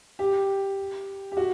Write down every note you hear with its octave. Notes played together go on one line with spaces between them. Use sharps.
G4
G4
F#4